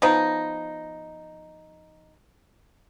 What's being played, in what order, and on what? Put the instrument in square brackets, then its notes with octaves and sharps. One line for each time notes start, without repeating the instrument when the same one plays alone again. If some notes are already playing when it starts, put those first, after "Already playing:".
[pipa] F3 B3 D#4